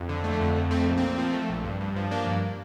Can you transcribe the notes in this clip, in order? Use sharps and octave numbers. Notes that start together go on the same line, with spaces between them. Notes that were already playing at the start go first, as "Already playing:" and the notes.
Already playing: F2
D3
A3
F2
F2
A3 C4
A#1
A#2 C4
F3
A3
A#1
G2
G2
F3
A#3 D4
G2